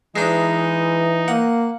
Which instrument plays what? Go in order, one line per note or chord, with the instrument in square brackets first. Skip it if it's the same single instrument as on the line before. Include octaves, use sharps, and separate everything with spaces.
[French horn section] E3 [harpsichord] G#3 D4 [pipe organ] D#4
[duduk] A#3 [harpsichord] F#5